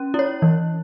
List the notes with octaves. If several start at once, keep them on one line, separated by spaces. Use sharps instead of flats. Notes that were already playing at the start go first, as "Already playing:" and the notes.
Already playing: C#4
E4 C#5
E3